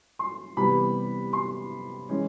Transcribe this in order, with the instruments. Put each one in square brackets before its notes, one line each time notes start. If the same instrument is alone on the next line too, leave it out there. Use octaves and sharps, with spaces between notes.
[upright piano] C6
C3 E3 G3 B3 B5
C6
E3 G#3 C#4